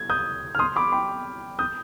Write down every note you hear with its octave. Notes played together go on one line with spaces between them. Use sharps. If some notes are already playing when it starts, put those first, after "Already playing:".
Already playing: G#6
D#6 G6
F6
C6 D#6
B5 D6
G5 B5
D#6 G6